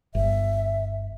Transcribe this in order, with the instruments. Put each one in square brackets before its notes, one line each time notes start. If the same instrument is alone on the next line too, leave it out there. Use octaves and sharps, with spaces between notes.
[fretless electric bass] G1 [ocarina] E5